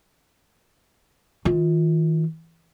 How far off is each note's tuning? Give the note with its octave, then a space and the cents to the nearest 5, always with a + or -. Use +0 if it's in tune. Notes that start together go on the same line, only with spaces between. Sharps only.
D#3 +40 F4 +10